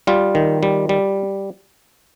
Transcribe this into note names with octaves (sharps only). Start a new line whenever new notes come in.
G3 F4
D#3
G3
G3